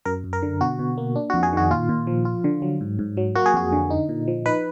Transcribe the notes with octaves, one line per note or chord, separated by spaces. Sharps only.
F#2 A#4
F#2
A#4
D3
B2 F#4
B2
A#3
D4
F#4
F2
G#4
D#3 F#4
A#2 F4
A#2
F3
F4
D3
F#3
G#2
G#2
F#3
A#3 F#4
G#4
F2 F#4
D3
D#4
A#2
F3
D#4 B4